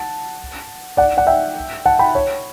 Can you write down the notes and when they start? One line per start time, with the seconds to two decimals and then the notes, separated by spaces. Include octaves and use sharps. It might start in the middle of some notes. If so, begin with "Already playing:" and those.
Already playing: F#5 A5
0.97 D5 F#5
1.17 D5 F#5
1.27 E5 G5
1.85 F#5 A5
1.99 G5 B5
2.15 C#5